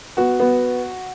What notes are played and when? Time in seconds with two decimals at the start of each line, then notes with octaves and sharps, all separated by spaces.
0.17 B3 F#4
0.40 B3